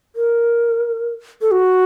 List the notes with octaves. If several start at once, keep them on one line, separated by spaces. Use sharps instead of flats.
A#4
A4
F#4